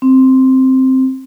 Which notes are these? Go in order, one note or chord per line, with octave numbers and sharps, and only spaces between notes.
C4